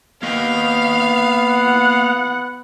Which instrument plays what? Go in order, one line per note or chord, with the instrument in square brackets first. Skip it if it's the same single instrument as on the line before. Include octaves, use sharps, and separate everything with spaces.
[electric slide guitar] A#3 D#5 G5 [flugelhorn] B3 [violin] F5
[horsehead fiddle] F#5